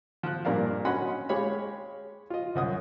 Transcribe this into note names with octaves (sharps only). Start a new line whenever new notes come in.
F3 F#6
G2 A#2 A#4 D5 F5
C#4 F#4 D#5 F#5 B5 C6
G#3 G4 C#5 F5 B5
F4 D#5
C2 F#2 D#6